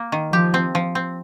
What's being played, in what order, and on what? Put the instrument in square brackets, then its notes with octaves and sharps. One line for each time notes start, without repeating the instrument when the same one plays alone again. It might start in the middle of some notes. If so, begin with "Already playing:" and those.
Already playing: [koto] A#3
D#3
[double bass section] F3 [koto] G4
[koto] C4
F3
C4